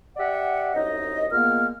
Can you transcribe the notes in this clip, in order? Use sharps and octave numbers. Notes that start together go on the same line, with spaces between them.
G4 D5 E5 F#5
C2 F#2 D#4 D#5
A#2 G#3 A#3 B3 F6